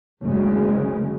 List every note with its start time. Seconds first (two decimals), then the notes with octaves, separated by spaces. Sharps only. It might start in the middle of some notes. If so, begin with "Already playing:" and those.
0.22 F#1 D2 C#3 G#3